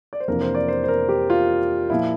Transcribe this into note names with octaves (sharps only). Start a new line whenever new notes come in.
D5
C5
F2 C3 E3 A#3 D4 A#4
C5
D5
C5
C5
A#4
G4
F4
A#2 F3 A#3 E4